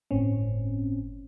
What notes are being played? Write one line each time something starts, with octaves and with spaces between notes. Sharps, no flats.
G1 A2 C4 C#4